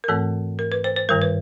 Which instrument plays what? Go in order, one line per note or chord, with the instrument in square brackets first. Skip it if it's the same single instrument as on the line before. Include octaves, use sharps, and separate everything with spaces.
[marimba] A#4
G#2 E3 A3 C4 A4
A#4
B4
C5
C5
G2 D#3 G3 A#4
B4